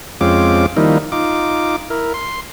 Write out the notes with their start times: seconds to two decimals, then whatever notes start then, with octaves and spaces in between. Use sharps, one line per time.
0.21 F2 G#3 C4 C#4 F4 D6
0.77 D#3 F3 G3 A#3 D#4 E4
1.12 D#4 F4 D6
1.90 E4 A#4
2.14 C6